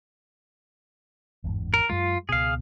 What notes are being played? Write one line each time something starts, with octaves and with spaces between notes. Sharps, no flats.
G1 E2 G#2
A#4
F#2 F#3 G#3 F4
C#2 B2 G#4 F5